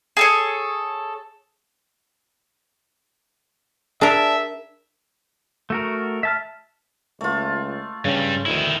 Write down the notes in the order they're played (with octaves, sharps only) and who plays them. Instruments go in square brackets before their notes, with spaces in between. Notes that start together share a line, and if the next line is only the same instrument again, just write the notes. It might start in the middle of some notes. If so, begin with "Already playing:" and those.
[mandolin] G#4 A4 C#5
[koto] D4 A#4 [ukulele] G#4 D5 A5 [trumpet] E5
[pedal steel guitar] A3 F#4 A#4
E5 A5 F6
[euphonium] C#2 [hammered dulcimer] A3 F4
[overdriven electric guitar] G2 G3 [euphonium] C#3
[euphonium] D2 [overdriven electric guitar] D#3 E4